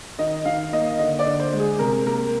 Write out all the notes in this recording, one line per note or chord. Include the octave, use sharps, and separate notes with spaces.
D#3 D#5
D#3 F5
A#3 D#5
D3 D#5
D5
D3
C5
G#3
G#4
C3 A#4
A#3 A#4